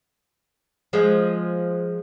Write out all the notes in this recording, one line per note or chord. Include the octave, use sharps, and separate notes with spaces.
F3 G#3